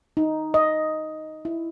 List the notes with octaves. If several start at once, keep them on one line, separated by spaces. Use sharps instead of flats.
D#4
D#5
E4